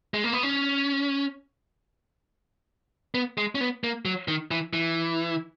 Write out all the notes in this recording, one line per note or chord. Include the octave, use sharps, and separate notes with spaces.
G#3
A#3
B3
C#4
B3
G#3
C#4
B3
A#3
F#3
D#3
E3
E3